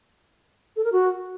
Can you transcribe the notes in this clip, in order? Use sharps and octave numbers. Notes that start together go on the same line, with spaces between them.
A4
A#4
F#4